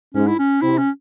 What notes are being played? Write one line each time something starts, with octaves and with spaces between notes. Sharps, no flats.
G#2 C#4
E4
C#4
C3 E4
C#4